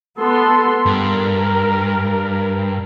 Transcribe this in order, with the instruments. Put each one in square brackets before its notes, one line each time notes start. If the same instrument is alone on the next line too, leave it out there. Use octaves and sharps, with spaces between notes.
[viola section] B3 A4 C6
[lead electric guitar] G2 [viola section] A#4